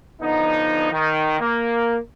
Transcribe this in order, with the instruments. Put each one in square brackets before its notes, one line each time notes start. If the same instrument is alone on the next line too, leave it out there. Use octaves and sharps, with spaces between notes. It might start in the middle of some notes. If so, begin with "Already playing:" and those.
[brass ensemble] D3 F3 B3 D#4
D#3
A#3